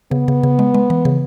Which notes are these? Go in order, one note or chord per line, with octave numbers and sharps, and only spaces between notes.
C#3 B3
C#3
C#3
G#3
G#3
E3
C#3